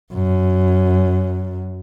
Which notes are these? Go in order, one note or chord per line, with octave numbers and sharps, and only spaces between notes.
F#2